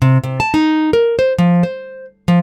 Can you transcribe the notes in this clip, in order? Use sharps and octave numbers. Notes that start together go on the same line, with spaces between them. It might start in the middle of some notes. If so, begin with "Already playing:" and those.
C3
C3
A5
D#4
A#4
C5
F3
C5
F3